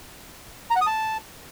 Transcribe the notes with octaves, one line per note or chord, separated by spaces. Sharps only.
A#5
F#5
D#6
A5